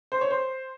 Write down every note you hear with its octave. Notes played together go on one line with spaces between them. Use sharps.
C5
C#5
C5